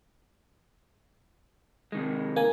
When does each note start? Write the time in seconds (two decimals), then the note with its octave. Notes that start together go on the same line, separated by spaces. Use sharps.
1.92 C3 D#3 G#3
2.36 A#3 G#5